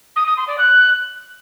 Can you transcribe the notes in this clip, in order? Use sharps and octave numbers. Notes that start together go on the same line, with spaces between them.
D#6
D#6
C6
D5
F#6